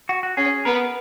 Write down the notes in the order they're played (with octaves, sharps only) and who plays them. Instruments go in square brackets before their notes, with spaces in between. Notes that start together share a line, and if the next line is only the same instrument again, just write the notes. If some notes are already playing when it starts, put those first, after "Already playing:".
[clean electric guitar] F#4
F#4
[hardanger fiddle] C#4 [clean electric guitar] G#4
[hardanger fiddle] B3 [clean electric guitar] A#4